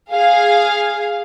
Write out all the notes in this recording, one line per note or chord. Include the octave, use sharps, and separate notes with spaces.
G#4 F5